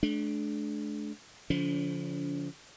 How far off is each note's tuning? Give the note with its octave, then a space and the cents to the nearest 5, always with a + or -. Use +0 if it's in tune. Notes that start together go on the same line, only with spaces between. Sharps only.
A3 -45 D4 +0
D3 -45 F3 -5 C#4 +45